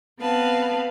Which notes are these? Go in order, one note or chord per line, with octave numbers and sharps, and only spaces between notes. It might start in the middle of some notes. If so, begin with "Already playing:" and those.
B3 C4 B4 F5 A5